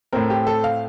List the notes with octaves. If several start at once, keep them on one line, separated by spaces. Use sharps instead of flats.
A2 A3 C4 A#4
G4
A4
F5